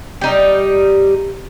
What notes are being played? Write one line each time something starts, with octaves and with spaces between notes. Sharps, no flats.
G3 D#4 G4